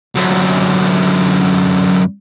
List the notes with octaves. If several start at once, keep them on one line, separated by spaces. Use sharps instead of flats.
F#2 D3